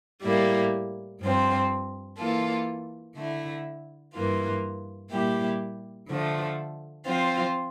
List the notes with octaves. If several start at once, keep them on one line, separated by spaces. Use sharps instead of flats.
A2 G3 A#3 E4
G2 F3 C4
E3 A#3 F4 A4
D3 A3 E4
G2 E3 A#3 F4
A#2 G3 A#3 E4 G4
D3 F3 A3
F3 C4 F4